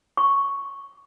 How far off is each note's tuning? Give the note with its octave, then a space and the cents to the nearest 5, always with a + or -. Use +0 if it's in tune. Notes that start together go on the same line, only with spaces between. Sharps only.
C#6 +0